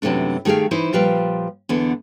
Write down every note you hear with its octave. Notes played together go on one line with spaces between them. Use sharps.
F#2 C3 E3 A3 D4
D#3 A3 G4 G#4 F5
E3 D#4 E4 C5
A#2 F3 G3 B4 F5 G5
E2 D3 B3